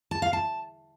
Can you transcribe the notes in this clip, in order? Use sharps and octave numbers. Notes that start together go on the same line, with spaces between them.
A5
F5
A5